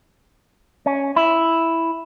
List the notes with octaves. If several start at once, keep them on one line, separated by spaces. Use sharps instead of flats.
C#4
E4